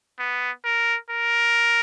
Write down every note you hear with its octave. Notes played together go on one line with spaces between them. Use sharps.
B3
A#4
A#4